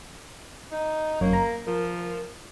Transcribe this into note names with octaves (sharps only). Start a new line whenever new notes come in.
D#4
G1 F#2 A#3 C#5
A#5
F3 A#4